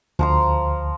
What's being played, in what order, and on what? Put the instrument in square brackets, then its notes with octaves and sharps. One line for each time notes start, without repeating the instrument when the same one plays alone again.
[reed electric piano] D2 [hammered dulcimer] F3 A#5 C6